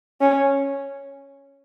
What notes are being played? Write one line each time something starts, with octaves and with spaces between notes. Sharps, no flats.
C#4